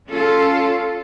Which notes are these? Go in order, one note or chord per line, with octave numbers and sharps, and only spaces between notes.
C#4 F4 A4